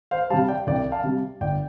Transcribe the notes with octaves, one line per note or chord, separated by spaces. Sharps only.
C5 F5
C3 G3 F5 A5
D5 G5
C2 D5 G5
F5 A5
C3 G3
G1 D5 G5